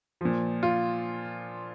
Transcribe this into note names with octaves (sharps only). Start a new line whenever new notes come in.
A#2 F3
F4